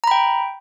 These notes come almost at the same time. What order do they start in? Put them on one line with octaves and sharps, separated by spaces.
A#5 B5 G5